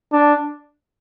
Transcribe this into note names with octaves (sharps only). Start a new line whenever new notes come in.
D4